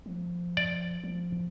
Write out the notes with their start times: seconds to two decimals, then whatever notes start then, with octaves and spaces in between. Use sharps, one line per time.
0.06 F3
0.57 D5
1.04 F3